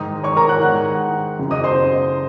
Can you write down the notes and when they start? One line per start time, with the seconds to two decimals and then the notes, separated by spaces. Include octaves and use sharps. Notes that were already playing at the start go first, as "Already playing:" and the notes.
Already playing: G#2 D#3 D#5 D#6
0.23 C#5 C#6
0.36 A#4 A#5
0.49 F#5 F#6
0.62 G#2 D#3 F#5 F#6
1.39 F#2 C#3
1.51 D#5 D#6
1.64 C5 C6